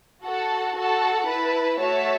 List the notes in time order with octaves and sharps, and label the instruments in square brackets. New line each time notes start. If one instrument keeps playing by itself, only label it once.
[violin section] F#4 A4 F#5 A5
F#4 A4 F#5 A5
E4 B4 A5
A3 F#4 C#5 E5 A5